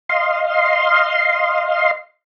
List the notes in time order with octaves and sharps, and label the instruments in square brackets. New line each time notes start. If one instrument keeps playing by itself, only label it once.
[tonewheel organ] D#5 F5 C6